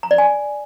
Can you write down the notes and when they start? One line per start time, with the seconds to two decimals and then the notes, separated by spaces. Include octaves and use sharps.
0.03 A#5
0.11 D5
0.18 G#5